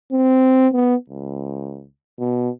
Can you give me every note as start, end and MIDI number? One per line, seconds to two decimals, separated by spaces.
0.12 0.68 60
0.73 0.95 59
1.10 1.86 37
2.19 2.50 47